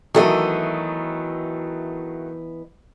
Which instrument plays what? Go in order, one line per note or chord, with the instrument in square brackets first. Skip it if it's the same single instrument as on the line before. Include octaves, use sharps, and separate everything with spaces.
[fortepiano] D#3 F#3 A3 [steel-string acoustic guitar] E3 B3 D#5